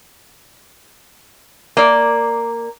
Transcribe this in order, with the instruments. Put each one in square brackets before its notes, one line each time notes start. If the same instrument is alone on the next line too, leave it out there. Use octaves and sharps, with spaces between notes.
[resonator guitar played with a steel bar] A#3 D5